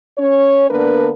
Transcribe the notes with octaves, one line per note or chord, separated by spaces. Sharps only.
C#4 C#5
D3 A#3 B3 D4 A#4 B4